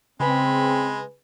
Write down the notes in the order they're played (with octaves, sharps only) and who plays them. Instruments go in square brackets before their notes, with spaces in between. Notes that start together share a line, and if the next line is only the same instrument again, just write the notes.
[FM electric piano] C#3 G#4 B4 [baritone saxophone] G#3 [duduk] C4 [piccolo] B5